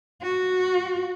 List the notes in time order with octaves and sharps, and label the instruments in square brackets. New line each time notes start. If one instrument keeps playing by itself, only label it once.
[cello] F#4